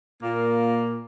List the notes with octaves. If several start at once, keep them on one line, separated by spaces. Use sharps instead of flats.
A#2 A#3